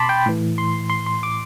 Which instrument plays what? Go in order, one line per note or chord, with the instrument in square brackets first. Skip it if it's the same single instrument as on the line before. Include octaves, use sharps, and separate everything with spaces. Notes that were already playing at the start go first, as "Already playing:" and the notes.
Already playing: [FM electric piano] B2 A5 B5 C6 D6
G5
A2 E3
C6
C6
C6
D6